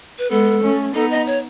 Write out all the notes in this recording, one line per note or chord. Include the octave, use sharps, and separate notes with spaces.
B4
G#3 B3 A4
A3 C#4
B3 D#4 A4
D#5
C#5